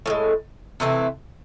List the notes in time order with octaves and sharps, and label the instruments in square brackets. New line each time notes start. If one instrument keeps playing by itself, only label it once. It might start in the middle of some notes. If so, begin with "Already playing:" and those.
[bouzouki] A2 F3
G#3
C3 E3 A3 C4